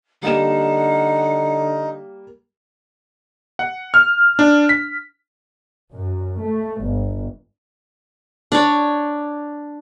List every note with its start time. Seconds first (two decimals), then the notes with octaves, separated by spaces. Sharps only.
0.23 D3 G3 A#3 D#4 F#5 E7
3.59 F#5
3.94 F6
4.39 D4
4.69 B6
5.91 F#2
6.41 A3
6.80 G1
8.52 D4 C#5